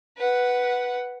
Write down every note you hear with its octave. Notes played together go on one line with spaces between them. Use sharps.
B4 F#5